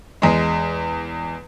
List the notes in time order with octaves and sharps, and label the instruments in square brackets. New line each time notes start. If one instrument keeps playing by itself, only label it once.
[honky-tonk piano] E2 G#3